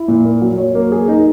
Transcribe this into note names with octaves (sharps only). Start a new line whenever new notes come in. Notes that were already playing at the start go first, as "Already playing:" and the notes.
Already playing: E4
A#2
A#3
F#3
C#5
A#3
G#4
D#4